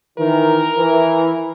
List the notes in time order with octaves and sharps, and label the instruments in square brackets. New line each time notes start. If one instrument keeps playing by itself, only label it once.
[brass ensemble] D#3 E3 [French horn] A#4
[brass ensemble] E3